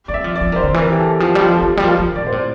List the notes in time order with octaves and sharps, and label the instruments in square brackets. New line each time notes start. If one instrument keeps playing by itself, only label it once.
[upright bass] G3 [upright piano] D5
[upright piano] E5
[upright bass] F3
[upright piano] D5
[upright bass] F3
[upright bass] E3 [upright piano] A#4
[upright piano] C5
[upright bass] D3
[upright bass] E3 [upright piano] A#4
[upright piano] G4
A4
[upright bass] F3 [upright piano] G4
[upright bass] G3
F3
[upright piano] G4
A4
[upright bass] E3
G3
[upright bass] F3 [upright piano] A#4
[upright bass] F3
[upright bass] A#2 [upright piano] D5
[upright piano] C5
[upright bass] A2